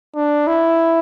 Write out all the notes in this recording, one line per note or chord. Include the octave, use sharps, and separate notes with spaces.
D4
E4